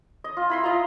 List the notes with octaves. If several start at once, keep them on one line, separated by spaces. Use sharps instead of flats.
D#5
F4
E4 B5 C6
F4 D#5 A#5